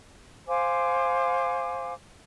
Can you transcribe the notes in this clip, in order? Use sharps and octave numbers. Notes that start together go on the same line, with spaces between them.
C5 F5 G#5 D6